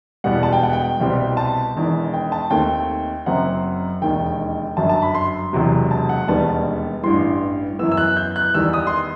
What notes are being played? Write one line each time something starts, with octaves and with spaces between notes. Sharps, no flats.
E1 E2 B2 G3 F#5
A5
G5
F#5
G5
C2 B2 G3 C4
A5
E1 E2 D#3
G5
A5
D#2 D#3 A3 C4 G5
F#1 F#2 F#3 C4 F#5
E1 D#2 D#3 G5
G1 F#2 F#3 A5
A5
B5
C6
E1 E2 C3 F#3
A5
F#5
E1 D#2 D#3 G3 B3 A5
A1 G2 E3 C6
F#2 E3 B3 E6
E6
F#6
G6
F#6
E2 D#3 G3 E6
D#6
C6